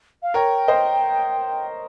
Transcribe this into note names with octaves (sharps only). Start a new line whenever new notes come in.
F5
A#4 C#5 G5
C5 D#5